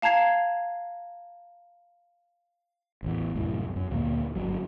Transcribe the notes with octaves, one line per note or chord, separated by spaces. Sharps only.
F5 A5 A#5 G#6 C7
A1 E2
C2 F#2 A2
F#2
D2 A#2 E3 A#3
G1 C#2 F#3